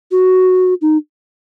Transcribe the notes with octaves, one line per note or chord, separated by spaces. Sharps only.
F#4
D#4